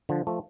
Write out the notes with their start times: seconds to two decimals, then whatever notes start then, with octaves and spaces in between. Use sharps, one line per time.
0.09 D3 F3
0.27 F3 A3